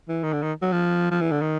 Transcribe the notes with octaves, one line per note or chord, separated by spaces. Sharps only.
E3
D#3
D3
D#3
F#3
F3
F3
E3
D3
D#3